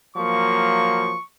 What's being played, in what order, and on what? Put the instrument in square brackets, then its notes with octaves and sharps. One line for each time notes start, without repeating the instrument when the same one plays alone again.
[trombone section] F3 F#3 A#3 [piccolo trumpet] C#6